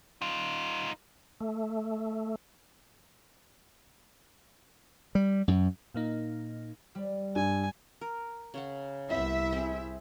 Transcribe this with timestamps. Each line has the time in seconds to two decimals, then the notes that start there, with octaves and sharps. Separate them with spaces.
0.22 D#4 F4
1.41 A3
5.15 G3
5.48 F#2
5.94 A#2 A#3 D#4
6.95 G3
7.36 G2 G#5
8.01 A#4
8.54 C#3 C#5 F#5
9.10 C2 B3 C4 E4 E5
9.53 C4 G#4